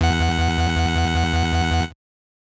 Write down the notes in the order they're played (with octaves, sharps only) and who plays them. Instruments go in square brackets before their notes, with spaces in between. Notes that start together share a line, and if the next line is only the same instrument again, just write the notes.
[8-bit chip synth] E2 F#5